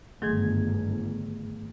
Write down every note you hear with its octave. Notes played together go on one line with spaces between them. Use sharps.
G1 G#2 D#3 F#3 A3 G#4 G#6